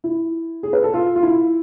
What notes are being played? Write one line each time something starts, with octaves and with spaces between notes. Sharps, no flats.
E4
G#4
B4
A4
F4
F4
E4